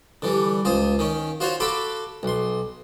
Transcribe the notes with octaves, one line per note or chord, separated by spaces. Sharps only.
D3 E3 G3
C#2 F4 C5 D#6
D#3 C#4
F4 F#4 C5 C#5
F#4 A4 B5 C6 D6
B1 C6